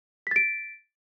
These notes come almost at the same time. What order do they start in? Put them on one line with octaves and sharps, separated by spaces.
B6 A6 D7